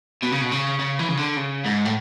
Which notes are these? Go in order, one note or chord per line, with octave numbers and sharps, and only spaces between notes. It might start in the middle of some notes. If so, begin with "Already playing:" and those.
B2
C#3
B2
C#3
C#3
E3
C#3
D3
C#3
G#2
A2